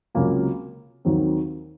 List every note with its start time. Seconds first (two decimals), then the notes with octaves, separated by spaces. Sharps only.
0.15 C#2 C3 F#3 A#3 F4
1.05 D#2 D#3 F#3 C4